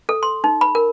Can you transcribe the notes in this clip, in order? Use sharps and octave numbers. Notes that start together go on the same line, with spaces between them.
A4
C6
D#4
B5
A#4